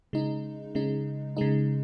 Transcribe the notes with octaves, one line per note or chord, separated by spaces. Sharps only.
C#3 G#3 D#4
C#3 G#3 D#4
C#3 G#3 D#4